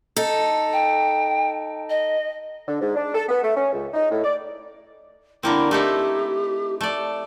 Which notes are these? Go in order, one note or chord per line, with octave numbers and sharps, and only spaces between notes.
D#4 A4
G5
D#5
D3
G#2
D4
A4
B3
A3
C#4
C#2
D#4
A2
D5
D3 A#3 C4 E4
A3 D#4 E4 G4
A3 D5